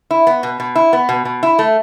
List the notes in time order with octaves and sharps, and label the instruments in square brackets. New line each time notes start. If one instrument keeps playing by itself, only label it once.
[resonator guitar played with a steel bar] E4
B3
B2
B2
E4
B3
B2
B2
E4
A3